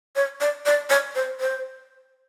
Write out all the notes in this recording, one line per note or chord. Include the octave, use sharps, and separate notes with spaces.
C#5
D5
D5
C#5
C5
C5